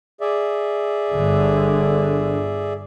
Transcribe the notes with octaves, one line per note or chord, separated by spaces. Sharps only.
G#4 D5 E5
G1 D3